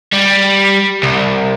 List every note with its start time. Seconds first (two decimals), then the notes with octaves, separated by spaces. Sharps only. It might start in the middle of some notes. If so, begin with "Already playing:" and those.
0.13 G3
1.03 C2